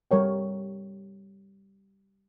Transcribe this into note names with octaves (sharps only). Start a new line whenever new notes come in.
G3 A#4 C#5 G5